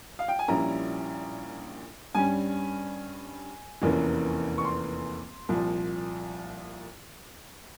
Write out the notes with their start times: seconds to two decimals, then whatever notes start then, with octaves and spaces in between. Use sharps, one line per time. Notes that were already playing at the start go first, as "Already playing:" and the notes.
0.19 F5
0.28 G5
0.39 G#5
0.48 A#1 A#2 G3 C#4 E4 A#5
2.15 G2 G3 C#4 G#5
3.82 F1 E2 E3 A#3 C#4
4.58 C#6
4.65 C6
5.49 C2 A#2 F3